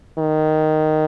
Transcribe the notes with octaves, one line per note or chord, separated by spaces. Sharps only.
D#3